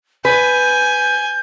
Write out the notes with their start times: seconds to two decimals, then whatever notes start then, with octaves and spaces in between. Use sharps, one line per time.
0.25 B4 G#5 G6